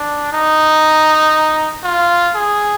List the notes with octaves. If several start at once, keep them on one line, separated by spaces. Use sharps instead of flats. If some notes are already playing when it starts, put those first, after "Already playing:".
Already playing: D4
D#4
F4
G#4